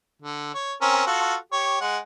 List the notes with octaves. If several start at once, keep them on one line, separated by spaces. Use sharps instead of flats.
D3
C#5
C4 C#4 A#4
F4 F#4 A4
G4 C#5
G#3 F#5